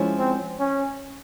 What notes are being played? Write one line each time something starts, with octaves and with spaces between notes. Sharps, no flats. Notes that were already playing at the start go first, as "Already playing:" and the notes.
Already playing: F3 G#3 C#4 E4
C4
C#4